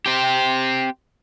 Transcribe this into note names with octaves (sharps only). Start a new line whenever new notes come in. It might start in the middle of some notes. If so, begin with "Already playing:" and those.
C4 G4